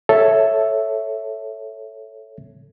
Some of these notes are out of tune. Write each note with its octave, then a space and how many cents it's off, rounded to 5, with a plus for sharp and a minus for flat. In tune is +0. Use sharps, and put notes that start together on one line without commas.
A4 +0 C#5 +0 E5 +0